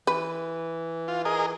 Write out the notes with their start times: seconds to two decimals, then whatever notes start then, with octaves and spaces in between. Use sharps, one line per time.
0.07 E3 B4
1.08 F4
1.25 G#4 A#4 D#5